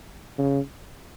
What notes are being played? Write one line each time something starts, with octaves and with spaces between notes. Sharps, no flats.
C#3